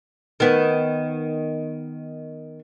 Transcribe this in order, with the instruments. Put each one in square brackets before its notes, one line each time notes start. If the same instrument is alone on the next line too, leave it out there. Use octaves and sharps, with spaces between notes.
[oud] D#3 B3